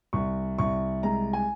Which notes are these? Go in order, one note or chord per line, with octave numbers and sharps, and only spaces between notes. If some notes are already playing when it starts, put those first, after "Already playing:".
C2 C#6
C2 C#6
G#3 A#5
G#5